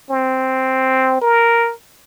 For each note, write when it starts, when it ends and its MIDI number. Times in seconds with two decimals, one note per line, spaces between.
0.11 1.18 60
1.22 1.72 70